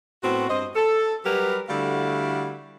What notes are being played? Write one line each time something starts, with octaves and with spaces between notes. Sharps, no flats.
A2 B3 C4 F#4
G2 C4 C5 D#5
A4
F#3 G3 G4 A#4 B4
D3 G3 A3 E4 F#4 F5